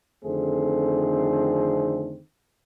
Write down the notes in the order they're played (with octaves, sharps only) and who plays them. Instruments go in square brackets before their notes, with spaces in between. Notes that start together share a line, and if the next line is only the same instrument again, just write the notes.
[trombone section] F2 D3 D#3 A3 C4 G#4